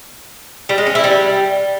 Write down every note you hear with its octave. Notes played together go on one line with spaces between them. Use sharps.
G3
G#3
C#4
E4
G3